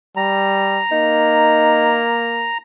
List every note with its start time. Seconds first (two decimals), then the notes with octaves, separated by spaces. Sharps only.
0.17 G3 A#5
0.91 A#3 D#4